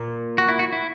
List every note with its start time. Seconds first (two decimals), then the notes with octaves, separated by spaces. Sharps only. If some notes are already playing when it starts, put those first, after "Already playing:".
Already playing: A#2
0.38 F#4
0.48 E4
0.59 F#4
0.73 E4